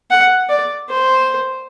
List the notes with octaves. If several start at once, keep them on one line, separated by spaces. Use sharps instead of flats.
F#5
D5
C5